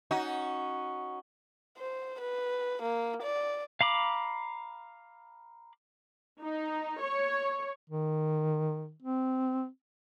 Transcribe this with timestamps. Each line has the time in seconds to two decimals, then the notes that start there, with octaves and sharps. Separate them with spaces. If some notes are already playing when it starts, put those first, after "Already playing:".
0.11 C#4 D#4 F#4
1.78 C5
2.20 B4
2.82 A#3
3.23 D5
3.81 F5 A#5 B5 D6
6.40 D#4
7.00 C#5
7.89 D#3
9.02 C4